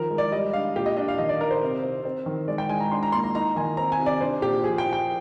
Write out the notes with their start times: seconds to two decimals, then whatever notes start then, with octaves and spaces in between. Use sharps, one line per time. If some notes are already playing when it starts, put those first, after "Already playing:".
Already playing: D#3 F3 A#4
0.10 G#3
0.18 D5
0.32 G3 D#5
0.53 D4 F5
0.76 A#2 G4
0.86 D#5
0.97 D4 D#5
1.08 F5
1.18 D#3 D#5
1.29 D5
1.40 D#4 A#4
1.51 C5
1.62 C3
1.83 C4
2.05 C4
2.26 D#3
2.48 G#3 D5
2.58 G5
2.69 G#3 G#5
2.80 A#5
2.91 D4 C6
3.03 A#5
3.12 A#3 C6
3.24 A#5
3.35 D#4 A#5
3.56 D#3 G#5
3.77 C4 A#5
3.92 G#5
4.00 C3
4.06 D5
4.21 D4 C5
4.42 A#2 G4
4.64 F3 G#4
4.78 G5
4.86 F3
4.93 G5